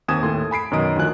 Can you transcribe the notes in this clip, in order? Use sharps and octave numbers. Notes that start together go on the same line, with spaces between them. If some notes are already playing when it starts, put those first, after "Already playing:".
D#2 C4 G#5 D#6 G#6 E7
D#2 A2 A4 C6
G#5 B5 C7 D7
F#2 B2 D#3 D#5 D#6 D7
D2 D#3 F3 F4 G#5 F#6